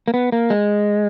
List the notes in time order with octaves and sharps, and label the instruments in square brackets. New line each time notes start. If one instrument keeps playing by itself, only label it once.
[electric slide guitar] A#3
B3
A#3
G#3